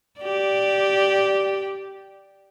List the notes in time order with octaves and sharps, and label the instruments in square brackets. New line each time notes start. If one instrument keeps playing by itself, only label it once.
[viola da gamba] G4 D5